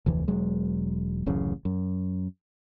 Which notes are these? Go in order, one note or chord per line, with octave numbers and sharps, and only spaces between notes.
F1 D2 E3
E1 F#3 G#3
D1 A1 F#2 C#3
F#2